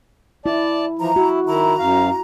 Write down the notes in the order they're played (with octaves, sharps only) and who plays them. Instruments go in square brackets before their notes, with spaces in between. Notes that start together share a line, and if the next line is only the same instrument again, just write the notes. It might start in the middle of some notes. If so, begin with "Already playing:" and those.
[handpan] E4 [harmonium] D5 A5
[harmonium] E3 F3 [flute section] A#5
[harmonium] E4 [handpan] F#4
[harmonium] D#3 E4 [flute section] A#5
[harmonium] F#2 F5